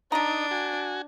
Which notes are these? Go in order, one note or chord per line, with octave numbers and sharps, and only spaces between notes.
D3 D4 D#4 A#5
F#4 G#5